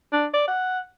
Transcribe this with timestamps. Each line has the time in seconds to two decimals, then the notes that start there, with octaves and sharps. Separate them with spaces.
0.13 D4
0.34 D5
0.48 F#5